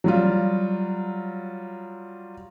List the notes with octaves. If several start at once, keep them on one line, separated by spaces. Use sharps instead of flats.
F#3 G3 F4